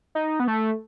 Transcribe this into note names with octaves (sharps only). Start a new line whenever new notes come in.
D#4
B3
A3